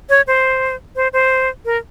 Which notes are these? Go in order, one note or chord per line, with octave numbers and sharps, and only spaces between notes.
C#5
C5
C5
C5
A#4